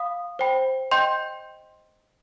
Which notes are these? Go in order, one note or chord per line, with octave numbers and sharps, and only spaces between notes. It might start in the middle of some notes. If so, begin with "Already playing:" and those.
Already playing: F5 B5 D#6
C5 G5 B5
D#5 G5 C6 G6